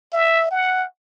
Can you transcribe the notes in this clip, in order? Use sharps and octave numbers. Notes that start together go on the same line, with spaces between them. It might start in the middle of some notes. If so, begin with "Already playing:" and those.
E5
F#5